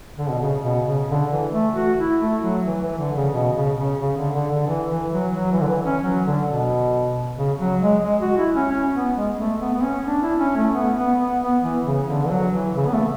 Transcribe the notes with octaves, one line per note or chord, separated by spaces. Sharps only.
D3
B2
C#3
B2
C#3
D3
E3
A3
F#4
E4
A3
F#3
E3
E3
D3
C#3
B2
C#3
C#3
C#3
D3
D3
D3
E3
E3
F#3
F#3
E3
D3
E3
C#4
F#3
D3
B2
C#3
F#3
G#3
G#3
F#4
E4
C#4
C#4
B3
G#3
A3
B3
B3
C#4
D4
E4
C#4
A3
B3
B3
B3
B3
E3
C#3
D3
E3
F#3
E3
C#3
B3
A3